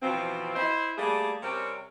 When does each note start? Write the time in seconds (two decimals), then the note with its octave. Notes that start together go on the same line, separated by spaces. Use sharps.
0.02 B2 E3 F3 C4
0.56 E4 C5 D#5
0.98 G3 A3 A#3 G#4
1.42 C3 G3 C4 C#4 G4 A#4